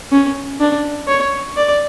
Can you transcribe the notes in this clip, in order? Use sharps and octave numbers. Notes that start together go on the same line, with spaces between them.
C#4
D4
C#5
D5